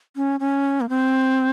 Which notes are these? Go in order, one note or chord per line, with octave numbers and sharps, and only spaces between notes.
C#4
C#4
A#3
C4